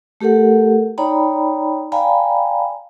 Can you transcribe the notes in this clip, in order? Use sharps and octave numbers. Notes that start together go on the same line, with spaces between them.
A3 G4 A4 A#4 F#5
D#4 C#5 D5 G5 A#5 B5
D5 F5 G5 G#5 A#5 B5